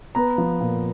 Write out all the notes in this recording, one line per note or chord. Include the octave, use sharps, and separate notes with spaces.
B3 A#5
F3
A#2